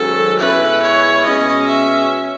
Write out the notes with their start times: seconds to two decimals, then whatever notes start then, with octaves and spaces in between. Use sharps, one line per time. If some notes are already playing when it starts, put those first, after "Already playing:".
Already playing: G#2 D#3 F#3 C#4 A4
0.39 B2 G#3 C#4 E4 B4
0.82 C#5
1.24 B2 G#3 C#4 D#5
1.67 E5